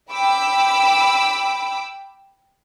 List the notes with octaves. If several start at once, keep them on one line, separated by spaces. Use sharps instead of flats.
G5 B5 D6 E6